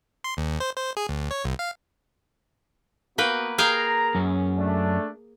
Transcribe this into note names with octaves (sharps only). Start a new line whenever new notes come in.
C6
D#2
C5
C5
G#4
D2
C#5
C2
F5
A#3 B3 F#4 B4 G5
G#4 A#4 F5 G5 A#5
F#2 C#4
A3 D4